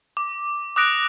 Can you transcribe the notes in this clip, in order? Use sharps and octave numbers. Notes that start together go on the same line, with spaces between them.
D6
D6 D#6 F#6 A#6 D7 F7